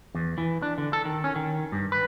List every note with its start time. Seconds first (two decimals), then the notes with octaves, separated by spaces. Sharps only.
0.15 E2
0.38 E3
0.62 D4
0.78 D3
0.93 A4
1.05 D#3
1.24 C#4
1.36 D#3
1.72 G2
1.92 B4